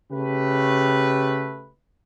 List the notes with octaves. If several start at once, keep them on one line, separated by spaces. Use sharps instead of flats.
C#3 A3 G4 B4